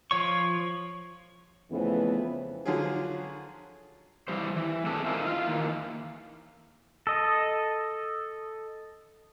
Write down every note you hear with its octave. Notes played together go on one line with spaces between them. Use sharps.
F3 C#5 C#6
F2 C#3 E3 A3 B3 C4
D3 F3 F#3 C#4 F4 G#4
E3 G3 C5
E3
C4 D4 G#4 A4 D5 E5
D#4 F4 A#4 C5 E5 G#5
E4 F4 F5
D#3 E3 A#3
A4 D#5